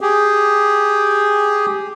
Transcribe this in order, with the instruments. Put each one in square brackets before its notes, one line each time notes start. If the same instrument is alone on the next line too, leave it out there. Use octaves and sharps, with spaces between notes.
[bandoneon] G4 G#4